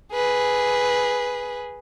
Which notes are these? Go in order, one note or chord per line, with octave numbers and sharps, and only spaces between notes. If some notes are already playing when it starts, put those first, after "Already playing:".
G#4 B4